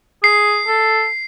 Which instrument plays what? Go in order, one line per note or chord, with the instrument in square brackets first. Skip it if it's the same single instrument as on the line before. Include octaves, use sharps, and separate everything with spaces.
[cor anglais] G#4 [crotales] C7
[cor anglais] A4